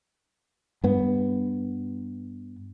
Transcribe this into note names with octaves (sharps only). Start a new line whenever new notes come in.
G2 B3